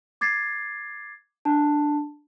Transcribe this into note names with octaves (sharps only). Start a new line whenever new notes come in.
D6 G#6 A6 C7
D4 A5